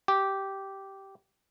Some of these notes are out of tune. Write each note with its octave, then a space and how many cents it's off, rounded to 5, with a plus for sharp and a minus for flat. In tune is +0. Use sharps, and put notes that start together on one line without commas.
G4 -10